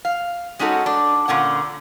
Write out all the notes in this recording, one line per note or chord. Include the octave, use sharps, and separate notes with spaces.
F5
G#3 C#4 D#4 F#4 A4
D4
A#2 D3 C#4 F#5